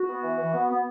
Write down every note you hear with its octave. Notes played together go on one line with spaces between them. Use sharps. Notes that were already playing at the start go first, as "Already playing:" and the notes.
Already playing: F#4
B3
E3
E3
B3
B3